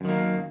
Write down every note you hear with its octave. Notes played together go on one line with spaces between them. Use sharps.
F#2 D#3 A#3